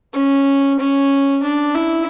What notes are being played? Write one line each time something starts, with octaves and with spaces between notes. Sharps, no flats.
C#4
C#4
D4
E4